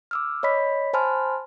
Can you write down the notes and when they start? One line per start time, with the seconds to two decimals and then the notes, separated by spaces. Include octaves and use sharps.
0.11 D6 E6 F6
0.43 C#5 D#5 B5 B6
0.93 C5 G#5 A5 B5 C6 F6